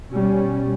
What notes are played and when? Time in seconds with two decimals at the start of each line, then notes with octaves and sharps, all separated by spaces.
0.11 B2 G3 C#4